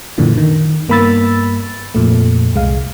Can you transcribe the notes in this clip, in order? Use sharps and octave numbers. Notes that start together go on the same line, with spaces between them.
F#2 A#2 D3 E3
D#3
G2 A#3 B3 B5 E6 A6
F2 A#2 A3
C2 G#3 F5